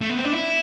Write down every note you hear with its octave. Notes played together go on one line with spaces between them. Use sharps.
A3
B3
C4
D4
E4